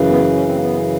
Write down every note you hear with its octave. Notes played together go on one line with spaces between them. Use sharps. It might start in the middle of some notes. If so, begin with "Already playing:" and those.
Already playing: F#2 C#3 E3
B3
C#4
C4
A#3
B3